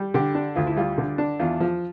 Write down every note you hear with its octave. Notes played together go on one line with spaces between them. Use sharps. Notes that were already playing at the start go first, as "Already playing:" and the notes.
Already playing: G3
D3 G4
D4
D2 F4
E4
G3 F4
D3
D4
E2 F4
F3